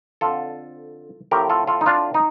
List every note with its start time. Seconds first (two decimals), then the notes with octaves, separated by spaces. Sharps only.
0.21 F2 D3 F3 C4 F4 A4
1.31 A2 F3 A3 C4 G4 A#4
1.50 F4 A4
1.67 F4 A4
1.81 D#4
1.86 D4 F4
2.14 D#4